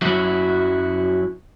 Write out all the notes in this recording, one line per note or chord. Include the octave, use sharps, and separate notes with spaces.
F#2 F#3 E4 F#4